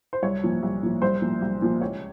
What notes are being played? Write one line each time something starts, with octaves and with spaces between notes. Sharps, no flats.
C5
C2 C#5
A#2 F3
C2
A#2 F3
C2 C5
A#2 F3
C2
A#2 F3
C#2 C#5